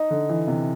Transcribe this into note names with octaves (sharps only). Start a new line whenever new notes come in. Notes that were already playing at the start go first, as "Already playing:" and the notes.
Already playing: D#4
D3
E3
C3